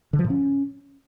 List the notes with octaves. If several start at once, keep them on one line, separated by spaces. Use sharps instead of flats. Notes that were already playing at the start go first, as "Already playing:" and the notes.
D3
F3
A2
C#4